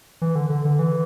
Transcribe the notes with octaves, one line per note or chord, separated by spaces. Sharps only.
E3
D3
D3
D3
E3